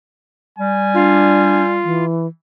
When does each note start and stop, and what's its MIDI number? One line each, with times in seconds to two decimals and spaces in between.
0.59 1.89 55
0.59 1.74 80
0.94 1.63 62
0.94 2.05 65
1.84 2.27 52